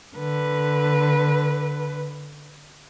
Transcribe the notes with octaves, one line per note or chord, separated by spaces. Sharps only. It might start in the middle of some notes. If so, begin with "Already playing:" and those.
D3 B4